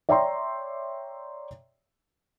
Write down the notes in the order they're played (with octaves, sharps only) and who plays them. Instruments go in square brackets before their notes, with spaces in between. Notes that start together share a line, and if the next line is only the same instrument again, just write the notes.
[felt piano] C#5 D5 E5 G5 A#5 C6